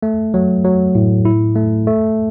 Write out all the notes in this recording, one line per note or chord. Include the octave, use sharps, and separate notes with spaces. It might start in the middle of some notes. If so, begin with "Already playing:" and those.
A3
F#3
F#3
A2
E4
A3
A3